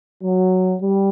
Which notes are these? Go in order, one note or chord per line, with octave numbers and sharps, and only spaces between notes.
F#3
G3